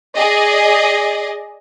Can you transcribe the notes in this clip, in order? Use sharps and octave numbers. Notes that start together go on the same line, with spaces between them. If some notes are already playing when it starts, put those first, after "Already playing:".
G#4 D5 D#5